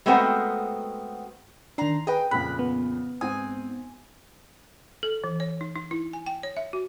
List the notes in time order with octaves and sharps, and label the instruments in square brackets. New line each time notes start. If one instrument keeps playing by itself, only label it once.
[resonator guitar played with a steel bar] G#3 A3 B3 C4 F#4 A#4
[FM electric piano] D#3 D4 [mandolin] A#5 C6
[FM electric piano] G#4 B4 [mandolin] D#5 G5
[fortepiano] F2 A#2 C#3 [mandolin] B5 [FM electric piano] F#6
[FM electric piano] B3
[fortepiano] G#2 C4 D#6 [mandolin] G#5
[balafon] A4
E3
C#5
D#4
D#4
E4
G#5
G5
C#5
E5
F#4